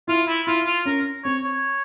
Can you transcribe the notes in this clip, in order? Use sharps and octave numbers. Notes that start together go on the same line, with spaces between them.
E4 F4
E4
E4 F4
F4
C#4 A#4
C4 C#5
C#5